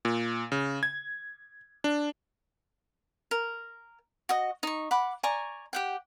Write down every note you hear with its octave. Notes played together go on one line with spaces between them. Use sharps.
A#2
C#3
G#6
D4
A#4
F#4 D#5
D#4 C#6
F#5 B5 D6
D5 G#5 A#5 C#6
G4 F#5 G5